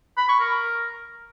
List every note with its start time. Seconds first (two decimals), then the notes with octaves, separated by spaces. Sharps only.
0.17 B5
0.28 C#6
0.40 A#4